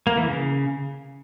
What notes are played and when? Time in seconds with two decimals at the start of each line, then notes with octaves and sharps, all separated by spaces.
0.07 A#3
0.17 E3
0.27 C#3